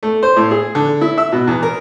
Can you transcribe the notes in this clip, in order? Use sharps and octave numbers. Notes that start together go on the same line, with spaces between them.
A3
C5
A2
G#4
D3
E4
E5
B2
E2
A#4